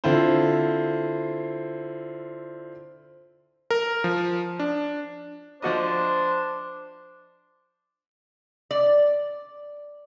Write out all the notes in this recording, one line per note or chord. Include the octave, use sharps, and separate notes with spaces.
D3 C4 E4 F4 C5
A#4
F3
D4
F3 D4 F#4 C5 D#5
D5